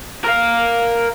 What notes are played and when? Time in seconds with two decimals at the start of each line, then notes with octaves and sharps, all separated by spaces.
0.25 A#4 F5